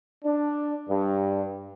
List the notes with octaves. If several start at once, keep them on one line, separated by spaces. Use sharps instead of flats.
D4
G2